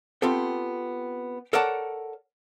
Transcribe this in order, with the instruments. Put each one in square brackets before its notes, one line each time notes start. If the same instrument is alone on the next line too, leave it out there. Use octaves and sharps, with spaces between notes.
[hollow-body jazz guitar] B3 C4 F4 G4 A4
A4 A#4 C#5 D5 F#5 A5